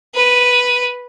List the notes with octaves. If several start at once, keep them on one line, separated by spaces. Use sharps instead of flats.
B4 D#7